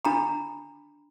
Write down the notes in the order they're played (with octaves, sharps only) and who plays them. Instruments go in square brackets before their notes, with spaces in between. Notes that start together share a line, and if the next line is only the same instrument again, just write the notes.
[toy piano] D4 A#5 B5